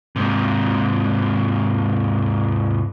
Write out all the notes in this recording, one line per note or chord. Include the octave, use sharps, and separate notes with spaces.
G#2 C3